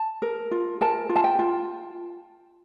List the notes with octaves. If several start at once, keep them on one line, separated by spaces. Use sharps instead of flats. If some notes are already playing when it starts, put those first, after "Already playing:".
Already playing: A5
A#4
F4
A#4 A5
F4
A5
G5
F4